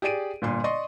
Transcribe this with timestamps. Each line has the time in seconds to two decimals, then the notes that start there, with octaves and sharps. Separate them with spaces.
0.02 G4 G#4 D5 D7 D#7
0.42 G1 A#2 C6
0.64 D5 D#5 C6 C#6